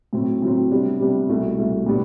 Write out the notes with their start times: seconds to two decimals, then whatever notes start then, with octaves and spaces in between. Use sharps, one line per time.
0.13 A2 F#3 C4
0.42 A2 F#3 C4
0.70 C3 G3 B3 D4
1.00 C3 G3 B3 D4
1.29 C2 B2 A3
1.58 C2 B2 A3
1.86 A2 G3 B3 D4